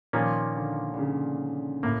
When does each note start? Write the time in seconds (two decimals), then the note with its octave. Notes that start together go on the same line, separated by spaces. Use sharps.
0.13 A#2 D#3 F3 A#3 C#4
0.56 D3
0.94 D3
0.99 C#3
1.83 A2 A#3